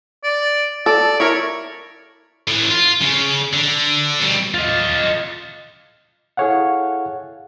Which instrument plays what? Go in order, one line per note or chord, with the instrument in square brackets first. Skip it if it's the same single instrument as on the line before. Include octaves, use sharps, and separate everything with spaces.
[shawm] D5
[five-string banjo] A4 [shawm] D5
[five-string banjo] E4 A#4 [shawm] C#5
[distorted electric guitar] A2 E3
F4
C#3
D3
B2 G3
F4 D#5
[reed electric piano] E4 G#4 A4 C#5 F5 F#5